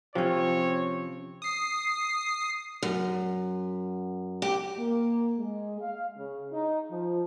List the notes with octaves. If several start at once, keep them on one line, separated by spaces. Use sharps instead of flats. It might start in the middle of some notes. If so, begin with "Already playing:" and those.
C3 F3 C4 C#4 C#5
D#6 C7
F#2
G4
A#3
G#3
F5
C#3
D#4
F3